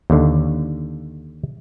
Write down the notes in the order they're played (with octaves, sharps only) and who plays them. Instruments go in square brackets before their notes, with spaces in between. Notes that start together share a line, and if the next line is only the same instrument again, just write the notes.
[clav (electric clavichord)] D#2 D3